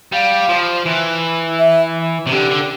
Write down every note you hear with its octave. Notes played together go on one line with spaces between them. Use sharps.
G3 F5
F3
E3
E5
C3
D3 G4
D3